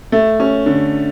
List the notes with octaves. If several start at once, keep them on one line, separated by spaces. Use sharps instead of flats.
A3
C#4
D3